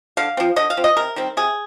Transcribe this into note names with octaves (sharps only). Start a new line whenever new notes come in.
D3 F5
F3 C4
D3 D#5
F5
F3 C4
D#5
C3 A#4
D#3 G3 C4
C3 G#4